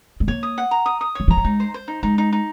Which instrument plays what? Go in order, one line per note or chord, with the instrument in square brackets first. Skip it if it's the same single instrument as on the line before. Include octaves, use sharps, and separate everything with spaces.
[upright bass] G#3
[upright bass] A#3 [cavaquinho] C#5
[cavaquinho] D#6
F#5
A#5
D#6
D#6
[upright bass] D#3 [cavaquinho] C#5
[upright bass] F3 [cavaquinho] A#5
[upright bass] F#3
[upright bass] G#3 [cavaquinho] D#4
[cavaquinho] C5
C5
D#4
[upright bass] G#3 [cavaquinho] D#4
[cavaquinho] D#4
D#4